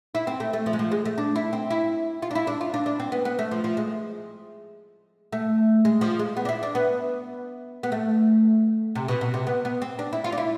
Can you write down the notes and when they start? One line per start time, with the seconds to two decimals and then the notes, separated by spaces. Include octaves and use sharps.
0.15 E4
0.27 C4
0.40 A3
0.53 A3
0.66 F3
0.73 G#3
0.79 F3
0.92 G#3
1.05 A3
1.18 D4
1.36 E4
1.53 C4
1.71 E4
2.22 F4
2.31 D4
2.35 E4
2.47 D4
2.61 F4
2.74 D4
2.86 D4
3.00 C4
3.12 B3
3.25 B3
3.39 A3
3.51 F3
3.64 F3
3.77 G#3
5.32 A3
5.85 G#3
6.01 F3
6.19 G#3
6.37 B3
6.45 D4
6.49 E4
6.63 D4
6.75 B3
7.83 B3
7.92 A3
8.95 C3
9.08 B2
9.21 B2
9.34 C3
9.47 B3
9.65 B3
9.82 C4
9.99 D4
10.13 E4
10.24 F4
10.32 D4
10.38 E4